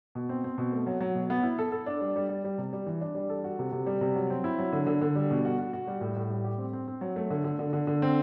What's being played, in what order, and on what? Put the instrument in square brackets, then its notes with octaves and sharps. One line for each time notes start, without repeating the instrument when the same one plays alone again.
[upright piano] B2
C4
C4
B2
A3
F#3
F#3
B2
B3
E4
A4
A4
D4
G3
G3
G3
G3
C3
G3
E3
D4
G3
A4
F#4
C3
C3
G3
C3
F#3
C4
E4
F#3
D3
D3
D3
G3
B2
F#4
F#4
F#4
G3
A2
A2
G3
G4
C4
C4
C4
F#3
A3
D3
D3
D3
D3
D3
C4